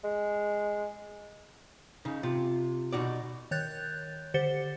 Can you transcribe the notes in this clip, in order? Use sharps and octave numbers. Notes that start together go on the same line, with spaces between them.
G#3
C#3 D#4
C3 F4
B2 D#4 F#4 D5
D#3 C#5 F#6 G6 A6
D3 G4 C5 A6 C#7 G7